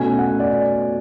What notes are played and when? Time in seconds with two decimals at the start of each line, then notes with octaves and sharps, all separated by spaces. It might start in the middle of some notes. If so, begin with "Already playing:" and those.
Already playing: B2 A3 C#4 G#5
0.19 F#5
0.40 D5